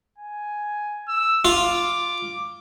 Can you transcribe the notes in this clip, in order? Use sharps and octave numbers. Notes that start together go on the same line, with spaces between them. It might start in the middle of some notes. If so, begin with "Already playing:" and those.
G#5
E6
F4 D6